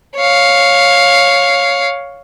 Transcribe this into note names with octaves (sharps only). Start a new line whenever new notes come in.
C#5 F5